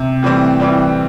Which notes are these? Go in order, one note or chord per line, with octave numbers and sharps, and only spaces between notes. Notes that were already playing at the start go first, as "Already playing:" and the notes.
Already playing: C3
A2 E3 G3 C4
A2 E3 G3 C4